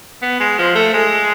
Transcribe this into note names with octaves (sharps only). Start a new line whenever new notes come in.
B3
G#3
F3
A3
G#3